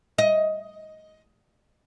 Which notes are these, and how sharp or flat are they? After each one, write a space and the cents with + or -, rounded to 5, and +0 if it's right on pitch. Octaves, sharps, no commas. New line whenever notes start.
D#5 +10